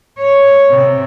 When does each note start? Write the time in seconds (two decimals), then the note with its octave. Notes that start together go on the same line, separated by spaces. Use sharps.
0.19 C#5
0.71 C3